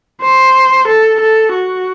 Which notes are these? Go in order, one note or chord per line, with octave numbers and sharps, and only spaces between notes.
C5
A4
A4
F#4